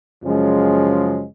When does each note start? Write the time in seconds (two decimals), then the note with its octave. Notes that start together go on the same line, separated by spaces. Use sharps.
0.22 F#2 C#3 F3 G#3 C#4